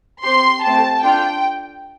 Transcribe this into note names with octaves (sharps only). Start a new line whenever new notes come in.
C4 G4 C6
A3 C4 G4 A5
D4 F4 A4 G5